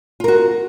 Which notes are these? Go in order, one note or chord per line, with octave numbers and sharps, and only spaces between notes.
F4 F#4 A#4